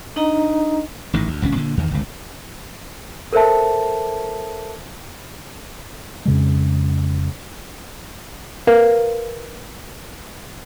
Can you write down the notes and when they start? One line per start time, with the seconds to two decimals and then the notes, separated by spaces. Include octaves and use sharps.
0.16 D4 D#4 D#5 A#5
1.14 A1 G#2 D#3
1.28 D2
1.42 D#1 C#2 C3 C#4
1.56 A#2 D3
1.77 E2 D#3
1.91 G1 C#2
3.33 A4 A#4 C5 E5 A5
6.26 F2 C#3 G#3
8.67 A#4 B4 F5